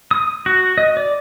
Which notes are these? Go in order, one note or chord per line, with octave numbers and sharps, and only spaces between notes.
D#6
F#4
D#5
D5